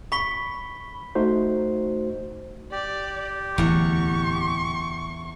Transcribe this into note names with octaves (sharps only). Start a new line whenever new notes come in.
B5 C#6 B6 G7
A3 D#4 F#4 C5
G4 D5
D1 E2 F#5 C#6